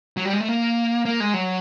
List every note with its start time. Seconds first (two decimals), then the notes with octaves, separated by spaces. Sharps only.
0.17 F#3
0.25 G3
0.33 G#3
0.40 A3
0.48 A#3
1.05 A#3
1.20 G#3
1.34 F#3